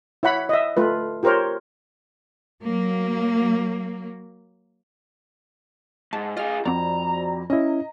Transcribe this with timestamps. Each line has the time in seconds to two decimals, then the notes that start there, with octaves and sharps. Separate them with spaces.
0.23 E4 C#5 F#5 B5
0.49 D#5 E5
0.77 A3 F4 B4
1.23 F4 G4 A#4 C5 C#5
2.62 F#3 A#3
6.13 G#2 A5
6.37 F4 G#4 D#5 F6
6.65 F2 C4 F#4 D5 A#5
7.50 C#4 E4 D#5